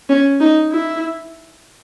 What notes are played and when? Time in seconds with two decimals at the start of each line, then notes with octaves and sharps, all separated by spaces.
0.09 C#4
0.40 D#4
0.71 E4